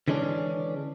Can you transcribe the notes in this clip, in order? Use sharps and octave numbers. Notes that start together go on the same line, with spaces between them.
D3 E3 G#3 C#4 D4